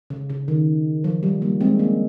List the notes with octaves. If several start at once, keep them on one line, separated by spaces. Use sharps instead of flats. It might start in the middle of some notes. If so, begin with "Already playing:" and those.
C#3
C#3
D#3
F3
G3
G3 A#3
G#3 C4
A#3 C#4